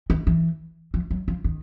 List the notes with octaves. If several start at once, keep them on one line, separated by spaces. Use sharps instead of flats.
D#3
E3
F3
F#3
F3
D#3